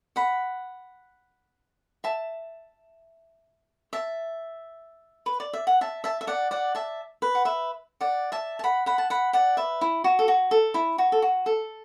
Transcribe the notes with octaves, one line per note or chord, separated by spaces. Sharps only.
F#5 B5
E5 A5
E5 A5
B4
D5
E5
F#5
E5 A5
E5 A5
E5
D5 F#5
D5 F#5
E5 A5
B4
F#5
B4 E5
D5 F#5
E5 A5
A5
F#5 B5
F#5 B5
A5
F#5 B5
D5 F#5
B4 E5
E4
F#4
A4
F#4
A4
E4
F#4
A4
F#4
A4